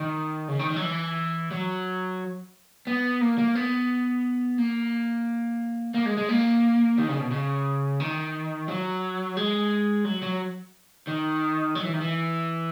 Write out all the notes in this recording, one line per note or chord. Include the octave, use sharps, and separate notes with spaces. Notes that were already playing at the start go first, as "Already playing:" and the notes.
Already playing: D#3
C#3
D#3
D#3
F#3
E3
F#3
B3
A#3
A#3
B3
A#3
A#3
G#3
G#3
A#3
D#3
C#3
B2
C#3
D#3
F#3
G#3
F#3
F#3
D#3
F#3
E3
D#3
E3